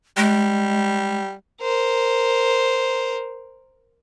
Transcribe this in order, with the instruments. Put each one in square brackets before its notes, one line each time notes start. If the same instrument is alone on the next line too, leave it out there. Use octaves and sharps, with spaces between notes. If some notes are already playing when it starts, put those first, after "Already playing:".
[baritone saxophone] G3 [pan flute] G#3
[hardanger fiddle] A#4 C5